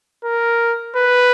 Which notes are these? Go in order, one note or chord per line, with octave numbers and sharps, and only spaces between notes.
A#4
B4